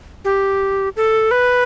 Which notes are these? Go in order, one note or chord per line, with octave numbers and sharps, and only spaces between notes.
G4
A4
B4